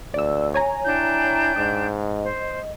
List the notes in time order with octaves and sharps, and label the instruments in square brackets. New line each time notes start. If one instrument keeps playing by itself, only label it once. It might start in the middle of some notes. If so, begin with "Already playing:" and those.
[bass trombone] D2 [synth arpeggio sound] D5 E6
[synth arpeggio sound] C#5 G#5 A#5
[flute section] D4 G5 G6 [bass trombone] E4
[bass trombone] G#2 [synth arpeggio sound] D#5
[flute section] C5